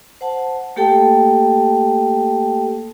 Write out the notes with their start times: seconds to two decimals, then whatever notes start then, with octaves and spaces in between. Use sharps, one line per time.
0.21 C5 F#5 A5
0.76 A3 A#3 G4 A4 G5 A5